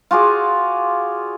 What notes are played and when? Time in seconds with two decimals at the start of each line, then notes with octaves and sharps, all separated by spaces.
0.11 F4 F#4 G#4 D5